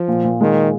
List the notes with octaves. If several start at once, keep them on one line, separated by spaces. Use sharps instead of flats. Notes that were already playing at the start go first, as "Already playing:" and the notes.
Already playing: F3
A#2
A#2
D#3 G#3